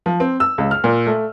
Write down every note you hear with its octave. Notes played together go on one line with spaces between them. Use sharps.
F3
C4
E6
C#2
F6
A#2
A3